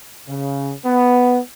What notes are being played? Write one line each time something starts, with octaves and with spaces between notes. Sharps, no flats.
C#3
B3